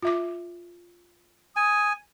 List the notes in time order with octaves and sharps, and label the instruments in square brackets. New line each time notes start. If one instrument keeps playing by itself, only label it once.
[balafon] F4 E5 D6
[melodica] G#5 [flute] D#6